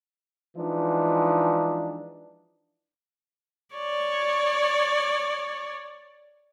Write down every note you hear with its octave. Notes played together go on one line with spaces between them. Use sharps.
E3 F3 G#3 D4 D#4
C#5 D5